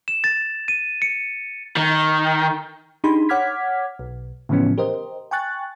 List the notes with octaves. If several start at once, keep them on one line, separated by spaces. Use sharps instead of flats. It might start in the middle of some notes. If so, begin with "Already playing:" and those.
E7
A6
D#7
C#7
D#3
D4 D#4 G4 G#4 B5 C6
C#5 F#5 D6 F6 G#6 B6
B1
A2 C#3 E3 F3 B3 C#4
G4 A#4 C5 D#5
G5 G#5 C#6 F#6 A6